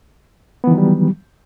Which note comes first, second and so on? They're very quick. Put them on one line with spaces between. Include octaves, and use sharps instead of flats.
B3 E3 D#3 F#3 G3